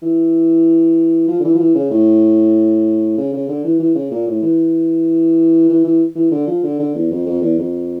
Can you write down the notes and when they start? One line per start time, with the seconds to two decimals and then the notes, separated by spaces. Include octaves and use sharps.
0.02 E3
1.28 F3
1.40 D3
1.44 E3
1.55 F3
1.60 E3
1.75 C#3
1.91 A2
3.18 C#3
3.33 C#3
3.48 D3
3.64 E3
3.79 E3
3.95 C#3
4.11 A#2
4.27 A2
4.42 E3
5.69 E3
5.84 E3
6.15 E3
6.31 D3
6.47 F3
6.64 D3
6.80 D3
6.95 E2
7.11 F2
7.26 F2
7.41 E2
7.58 F2